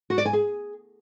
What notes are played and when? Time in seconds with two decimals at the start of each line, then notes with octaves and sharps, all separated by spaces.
0.10 F#4
0.18 D5
0.25 G#5
0.33 G#4